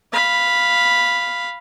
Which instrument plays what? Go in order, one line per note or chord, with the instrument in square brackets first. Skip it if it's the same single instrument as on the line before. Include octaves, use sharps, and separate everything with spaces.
[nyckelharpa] F5 B5